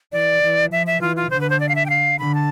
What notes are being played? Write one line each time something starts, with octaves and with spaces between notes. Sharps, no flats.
E3 D5
E3
F3 E5
E5
E3 F4
F4
D3 C5
B4
C5
D5
F5
E5
G5
F5
D3 B5
A5